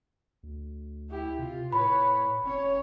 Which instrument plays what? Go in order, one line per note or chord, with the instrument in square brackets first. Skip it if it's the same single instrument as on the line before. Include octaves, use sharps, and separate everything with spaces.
[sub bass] D2
[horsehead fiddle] E4 G4
[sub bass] C3 [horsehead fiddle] F4
[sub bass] A2 [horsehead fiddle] B4 C#5 [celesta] B5
[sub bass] F1 [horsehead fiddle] C#4 C#5